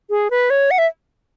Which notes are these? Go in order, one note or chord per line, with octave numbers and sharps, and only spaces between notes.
G#4
B4
C#5
F#5
E5